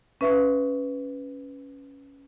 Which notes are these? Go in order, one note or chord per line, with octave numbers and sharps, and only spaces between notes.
C#4 B4 E5